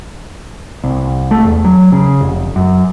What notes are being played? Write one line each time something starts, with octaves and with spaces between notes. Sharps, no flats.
C2
A3
E2
F#3
C#3
F1
F#2